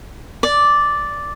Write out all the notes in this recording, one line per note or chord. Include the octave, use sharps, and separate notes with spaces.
D5